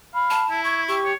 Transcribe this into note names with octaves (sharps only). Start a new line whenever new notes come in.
F5 B5
A5
E4
C#6 G#6
G4 C#6
C#5